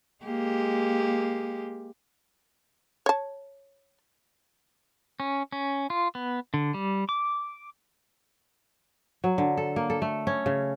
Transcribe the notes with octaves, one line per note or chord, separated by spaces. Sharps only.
G#3 A#3 G4
C#5 A5
C#4
C#4
F4
B3
D3
G3
D6
F#3
D3
A4
A#3
A4
A3
C#4
C#3